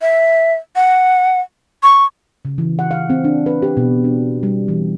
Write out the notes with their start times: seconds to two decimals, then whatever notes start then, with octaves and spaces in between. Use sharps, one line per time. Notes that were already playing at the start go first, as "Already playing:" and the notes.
0.02 E5
0.76 F#5
1.83 C#6
2.45 C#3
2.58 E3
2.79 F#5
2.91 F5
3.10 C4
3.24 D4
3.46 B4
3.62 G4
3.77 B2
4.04 D4
4.43 G3
4.68 E3